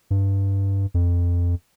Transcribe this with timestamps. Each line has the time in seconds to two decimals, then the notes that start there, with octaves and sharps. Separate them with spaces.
0.11 G2
0.94 F2